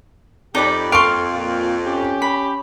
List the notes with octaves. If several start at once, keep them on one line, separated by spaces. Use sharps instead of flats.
F2 D#4 G4 D5 B5
A4 F5 C6 C#6 D7
A#2 F4
C#4 G4
B5